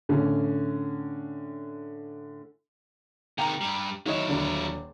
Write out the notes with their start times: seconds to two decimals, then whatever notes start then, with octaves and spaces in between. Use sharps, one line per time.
0.09 A2 D3 C#4
3.38 C3 D#3 G5 A#5
3.61 G2 G3
4.06 D#3 F#3 E4 C#5 D#5
4.29 D#1 D3 D4